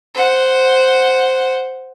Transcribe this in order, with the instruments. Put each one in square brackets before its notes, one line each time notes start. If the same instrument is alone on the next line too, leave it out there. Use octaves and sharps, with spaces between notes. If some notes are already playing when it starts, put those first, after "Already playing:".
[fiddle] C5 F#5